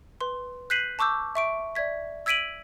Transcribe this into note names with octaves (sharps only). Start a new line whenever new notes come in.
B4 C6
F#6 G6 B6 C7 D#7 F#7
A5 C#6 D6 E6 G6
E5 C#6 D7
D5 E5 G#6 B6
E6 G#6 B6 D7 D#7 F#7